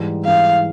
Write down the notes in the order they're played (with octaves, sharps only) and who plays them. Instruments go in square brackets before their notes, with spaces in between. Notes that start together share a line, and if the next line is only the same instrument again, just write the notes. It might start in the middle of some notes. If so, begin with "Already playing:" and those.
Already playing: [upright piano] G#2 E3 G3
[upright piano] G#2 E3 G3 [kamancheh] F5